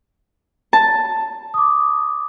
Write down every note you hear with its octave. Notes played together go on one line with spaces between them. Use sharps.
A5
D6 D#6